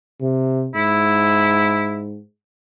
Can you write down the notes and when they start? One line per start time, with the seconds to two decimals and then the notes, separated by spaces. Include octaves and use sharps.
0.21 C3
0.75 G#2 E4